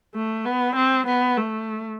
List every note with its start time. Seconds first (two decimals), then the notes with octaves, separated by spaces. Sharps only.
0.15 A3
0.45 B3
0.76 C4
1.07 B3
1.38 A3